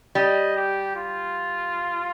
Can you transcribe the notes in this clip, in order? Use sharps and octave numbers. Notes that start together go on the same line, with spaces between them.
G3 D#5
G4
F4